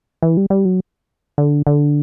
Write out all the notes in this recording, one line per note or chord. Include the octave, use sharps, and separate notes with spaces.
E3
G3
G3
F#3
D3
D3